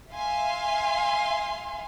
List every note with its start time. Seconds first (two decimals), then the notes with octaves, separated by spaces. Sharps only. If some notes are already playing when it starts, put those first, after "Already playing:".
0.13 E5 F5 G#5 C6